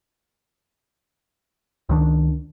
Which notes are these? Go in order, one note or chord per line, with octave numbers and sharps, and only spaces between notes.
C#2 D#3 D4